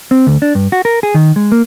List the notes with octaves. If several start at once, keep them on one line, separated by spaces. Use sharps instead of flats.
C4
D2
D4
G2
F#4
A#4
G#4
D#3
G#3
A#3